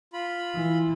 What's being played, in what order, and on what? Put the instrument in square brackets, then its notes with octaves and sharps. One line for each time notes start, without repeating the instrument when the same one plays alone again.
[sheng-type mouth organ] F4 B5
[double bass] E3